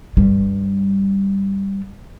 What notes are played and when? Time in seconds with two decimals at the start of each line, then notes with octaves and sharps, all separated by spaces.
0.17 G2 G3